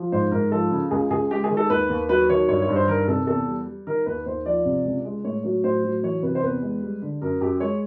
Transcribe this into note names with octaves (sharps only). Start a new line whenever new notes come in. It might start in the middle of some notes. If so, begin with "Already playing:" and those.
Already playing: F3
G#2 C5
G#2 A#4
F3 A4
C#3
C#2 G#4
C#2 G#4
G#3 G4
G#4
D#3
A4
D#2 B4
D#2
F#3 B4
D#3 C#5
G2 C#5
C#5
G2
C5
D#3 A#4
C3 A4
E2 A4
G3
G3
D#3 A#4
D#2 B4
D#2 C5
F3 D5
C3
C#2
G#3
A2 C#5
F#3 C#5
A2 C5
F#3
E3 C#5
C3 B4
C5
E2 B4
G#3
G3
D3
F#2 A#4
F#2 G4
G#3 C#5